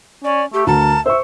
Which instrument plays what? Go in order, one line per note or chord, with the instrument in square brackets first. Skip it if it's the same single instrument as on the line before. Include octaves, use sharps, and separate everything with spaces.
[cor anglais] C#4 [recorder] D5
[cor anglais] A3 [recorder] G4
[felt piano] D2 [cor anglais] A#4 [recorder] A5
[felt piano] C5 C#6 [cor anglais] E5